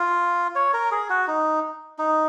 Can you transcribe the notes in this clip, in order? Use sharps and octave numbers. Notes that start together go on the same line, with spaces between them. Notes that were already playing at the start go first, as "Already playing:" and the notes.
Already playing: F4
C#5
A#4
G#4
F#4
D#4
D#4